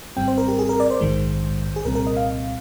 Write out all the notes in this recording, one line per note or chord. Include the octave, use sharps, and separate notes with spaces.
G#1 G#2 G3 C4 G5
C5
A#4
G4
G#4
A#4
D5
C5
A#1 G#2 D#3 G#3
G#4
C2 A#2 G3 C4 A#4
A#4
D#5
F5